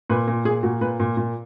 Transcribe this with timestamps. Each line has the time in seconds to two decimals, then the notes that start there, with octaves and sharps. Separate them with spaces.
0.10 A#2 B4
0.28 A#2
0.45 A#2 G#4
0.63 A#2 F#4
0.81 A#2 B4
1.00 A#2
1.17 A#2